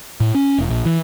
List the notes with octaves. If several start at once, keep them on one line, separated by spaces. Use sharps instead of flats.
A2
C#4
E1
A#1
E3